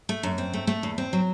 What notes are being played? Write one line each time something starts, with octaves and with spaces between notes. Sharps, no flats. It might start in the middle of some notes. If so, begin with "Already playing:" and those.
A3
F#2
C4
A3
A3
E2
C4
F#3